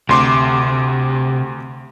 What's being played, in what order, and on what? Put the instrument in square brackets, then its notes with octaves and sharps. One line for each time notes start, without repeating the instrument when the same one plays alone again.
[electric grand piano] D2 C6 D6 [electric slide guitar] C3